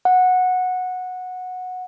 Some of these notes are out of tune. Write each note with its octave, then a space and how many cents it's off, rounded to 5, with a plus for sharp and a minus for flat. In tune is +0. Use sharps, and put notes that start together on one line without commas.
F#5 -10